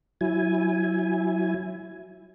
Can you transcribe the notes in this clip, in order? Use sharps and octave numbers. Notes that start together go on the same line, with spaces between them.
F#3 E4 G#5